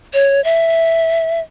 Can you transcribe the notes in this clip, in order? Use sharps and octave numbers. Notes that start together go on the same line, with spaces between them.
C#5
E5